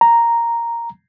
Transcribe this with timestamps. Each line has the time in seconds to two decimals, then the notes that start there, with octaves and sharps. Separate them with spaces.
0.01 A#5